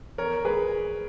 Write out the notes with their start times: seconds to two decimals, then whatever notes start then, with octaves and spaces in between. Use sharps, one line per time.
0.18 E2 A#4 C#5
0.45 G#3 G#4 B4